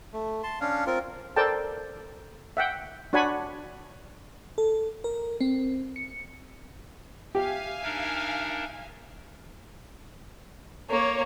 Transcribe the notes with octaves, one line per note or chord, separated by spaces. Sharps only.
A3
A5 C6
C#4 D4 F5
C4 F4 A#4
A4 A#4 C5 D5 G5 A5
E5 F#5 G5
D4 F#4 C#5 F#5 G#5 B5
A4
A#4
C4
C#7
G4 E5 F5 G#5
D4 D#4 A#4
A#3 C#5